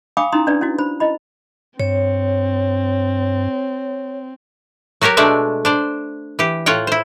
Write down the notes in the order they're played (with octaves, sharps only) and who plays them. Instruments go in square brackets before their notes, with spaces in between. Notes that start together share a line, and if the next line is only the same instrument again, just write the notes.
[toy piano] F5 G5 G#5 B5 D6 D#6
C#4 D#4 E4 A#5 C6 D#6
C#4 D4 B4 D5
C#4 E4 F#4
C5 B5
E4 D#5 B5
[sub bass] G2 [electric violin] C4 [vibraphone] C#5
[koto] F#3 F#4 G4 A#4 C#5
B2 G#3 A3 D4 D5 E5
D4 C5 D5
E3 G4
A2 F4 C#5 F#5 G5
E4 C5